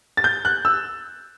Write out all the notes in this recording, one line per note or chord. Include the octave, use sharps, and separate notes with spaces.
A6
G6
F#6
E6